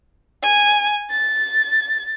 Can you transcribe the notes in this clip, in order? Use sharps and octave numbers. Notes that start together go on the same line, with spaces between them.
G#5
A6